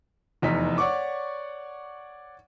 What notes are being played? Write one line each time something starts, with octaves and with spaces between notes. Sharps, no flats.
F1 E2 D#4 B6
C#5 D5 F#5 C#6 D6